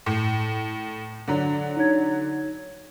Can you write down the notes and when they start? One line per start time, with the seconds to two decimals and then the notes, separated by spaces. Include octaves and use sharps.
0.06 A2
1.28 D3 F#3
1.77 D#4 C#5 G#6